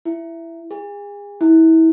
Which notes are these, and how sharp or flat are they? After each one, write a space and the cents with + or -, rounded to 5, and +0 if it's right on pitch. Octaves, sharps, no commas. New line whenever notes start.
E4 +10
G#4 -35
E4 -30